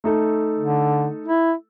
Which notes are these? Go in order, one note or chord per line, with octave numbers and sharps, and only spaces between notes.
A3 D#4 A4
D3
E4